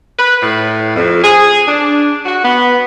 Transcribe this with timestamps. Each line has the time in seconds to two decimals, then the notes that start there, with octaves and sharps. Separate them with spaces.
0.18 B4
0.43 A2
0.96 F2
1.23 G#4
1.68 D4
2.26 F#4
2.44 B3